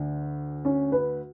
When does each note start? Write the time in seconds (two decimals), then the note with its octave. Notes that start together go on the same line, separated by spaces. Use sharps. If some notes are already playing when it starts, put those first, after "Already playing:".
Already playing: D2 D4
0.65 C#4
0.92 B4